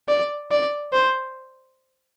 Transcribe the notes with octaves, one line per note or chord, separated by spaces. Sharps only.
D5
D5
C5